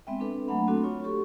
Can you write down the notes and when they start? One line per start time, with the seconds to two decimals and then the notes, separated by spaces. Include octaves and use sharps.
0.07 G#3 B3 C4 E5 G5
0.20 C4 D4 A4 B4
0.48 F#3 A3 A#3 D4 F#5 B5
0.67 A3 C4 D4 F#4 A4
0.84 F4 C#5 C#6
1.04 G4 A4 C#6